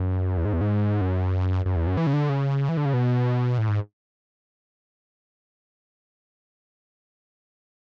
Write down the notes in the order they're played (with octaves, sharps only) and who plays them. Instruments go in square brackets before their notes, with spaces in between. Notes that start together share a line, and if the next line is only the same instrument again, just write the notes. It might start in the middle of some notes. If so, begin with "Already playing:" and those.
Already playing: [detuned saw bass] F#2
E2
G#2
E2
G#2
F#2
F#2
E2
F#2
E3
C#3
D3
C#3
E3
D3
C#3
B2
A2
G#2